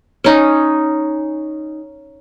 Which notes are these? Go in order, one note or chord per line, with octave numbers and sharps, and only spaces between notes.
C#4 D#4